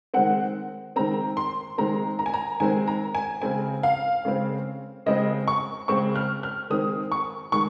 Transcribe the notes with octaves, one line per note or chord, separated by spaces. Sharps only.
D#3 G#3 C4 F#5
D#3 G#3 C4 A#5
C6
D#3 G#3 C4 A#5
A#5
G#5
A#5
D#3 G#3 C4 G#5
A#5
G#5
C#3 G#3 C4 G#5
F5
C#3 G#3 C4
C#3 G#3 C4 D#5
C#6
C#3 G#3 C4 C#6
F6
F6
D#3 G#3 C4 D#6
C#6
D#3 G#3 C#6